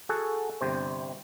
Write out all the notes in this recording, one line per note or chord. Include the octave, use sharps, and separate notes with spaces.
F#4 G#4 A4 F#5
G1 C3 C5